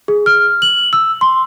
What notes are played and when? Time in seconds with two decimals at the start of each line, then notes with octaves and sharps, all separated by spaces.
0.08 G#4
0.26 F6
0.62 F#7
0.93 E6
1.21 C6